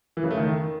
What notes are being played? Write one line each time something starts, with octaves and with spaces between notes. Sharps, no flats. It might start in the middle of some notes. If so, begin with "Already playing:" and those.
E3
C#3
A3
D#3